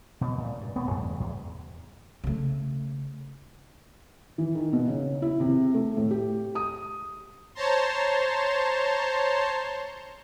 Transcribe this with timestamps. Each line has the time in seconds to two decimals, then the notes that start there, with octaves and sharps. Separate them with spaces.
0.21 B2
0.38 A#2
0.59 G2
0.76 D#1 G2 A3 B3
0.91 E2 G2 C#3 A3
1.20 E2
2.24 C#3 A3
4.38 E3
4.55 D#3
4.73 B2
4.88 C#3
5.22 E4
5.40 C3
5.74 A3
5.97 A2
6.11 G4
6.55 D#6
7.55 C5 C#5 A5 A#5 C6